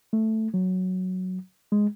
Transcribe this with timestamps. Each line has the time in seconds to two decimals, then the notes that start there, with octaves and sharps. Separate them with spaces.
0.13 A3
0.54 F#3
1.72 G#3